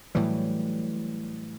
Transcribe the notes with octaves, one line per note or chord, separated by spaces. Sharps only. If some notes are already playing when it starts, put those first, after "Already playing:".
A2 E3 F#3 G3